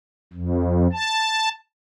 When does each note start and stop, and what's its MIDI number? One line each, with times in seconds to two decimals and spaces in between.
0.34 0.88 41
0.93 1.49 81